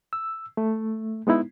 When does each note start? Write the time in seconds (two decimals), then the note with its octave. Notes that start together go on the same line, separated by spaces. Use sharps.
0.13 E6
0.57 A3
1.27 G#3 B3 D#4 E4